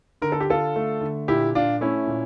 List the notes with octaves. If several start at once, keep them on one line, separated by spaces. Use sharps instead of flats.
D3 A#4
A4
G4
D3 F4 A4
A3
D3
A#2 E4 G4
A#2 D4 F4
A3 C#4 E4
A#2